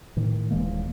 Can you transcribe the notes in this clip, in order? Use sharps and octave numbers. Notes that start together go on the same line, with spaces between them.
A2 D#3
D#1 E3 G#3 A#3